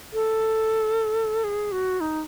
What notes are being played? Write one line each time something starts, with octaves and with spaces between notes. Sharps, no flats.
A4
G#4
F#4
D#4